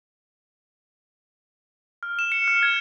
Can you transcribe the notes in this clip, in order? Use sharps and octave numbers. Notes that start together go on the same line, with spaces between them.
F6
E7
C#7
F6
G#6